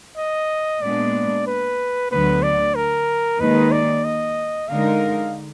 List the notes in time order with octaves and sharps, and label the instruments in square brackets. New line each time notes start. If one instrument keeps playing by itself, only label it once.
[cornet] D#5
[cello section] A#2 G#3 B3 D4 [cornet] D5
[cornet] B4
[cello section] D2 D3 F#3 B3 [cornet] B4
[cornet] D5
A#4
[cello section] D#2 D#3 G#3 D#4 [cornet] B4
[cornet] D5
D#5
[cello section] D3 G#3 D#4 A#4 [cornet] F5